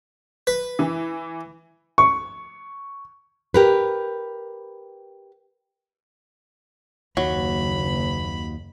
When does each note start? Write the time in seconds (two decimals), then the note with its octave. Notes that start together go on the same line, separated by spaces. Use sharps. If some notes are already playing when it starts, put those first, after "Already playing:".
0.47 B4
0.79 E3
1.98 C#6
3.54 G4 A#4 B4
7.17 F#1 D#2 F#3 B5